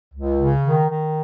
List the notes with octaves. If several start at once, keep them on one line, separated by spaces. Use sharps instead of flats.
C#2
C#3
D#3
D#3